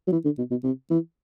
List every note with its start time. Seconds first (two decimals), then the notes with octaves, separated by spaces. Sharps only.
0.07 F#3
0.12 E3
0.25 D3
0.38 B2
0.51 B2
0.63 C3
0.90 E3